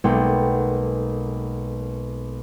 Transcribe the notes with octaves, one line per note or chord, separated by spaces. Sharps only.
B1 G#3 A#3 A4 F#5 G5